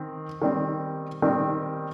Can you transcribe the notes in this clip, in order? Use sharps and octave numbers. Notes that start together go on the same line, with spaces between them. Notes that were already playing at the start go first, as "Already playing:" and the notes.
Already playing: D#3 C4
D#3 G3 C4
D#3 G3 C4